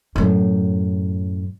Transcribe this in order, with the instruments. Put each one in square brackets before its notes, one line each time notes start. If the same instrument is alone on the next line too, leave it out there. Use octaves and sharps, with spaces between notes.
[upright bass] F#2 A2